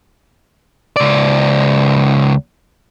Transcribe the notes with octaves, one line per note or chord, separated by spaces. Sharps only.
C#2 D5